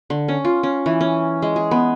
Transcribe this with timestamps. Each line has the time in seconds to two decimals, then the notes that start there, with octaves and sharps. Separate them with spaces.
0.10 D3
0.28 C#4
0.45 F4
0.63 C#4
0.86 E3
1.01 C#4
1.42 G#3
1.56 G#4
1.71 B3